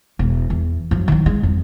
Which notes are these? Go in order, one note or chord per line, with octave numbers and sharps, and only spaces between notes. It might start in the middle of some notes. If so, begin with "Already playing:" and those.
E1
E2
F#2 F3
D#3 F#3
G#3
F2